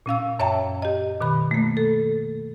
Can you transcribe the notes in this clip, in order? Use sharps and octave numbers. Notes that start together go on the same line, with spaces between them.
A#2 C#4 F5 E6
F#2 C#5 E5 G5 A5 A#5
G4 D#5
B2 D#3 B5
A3 A#3
A4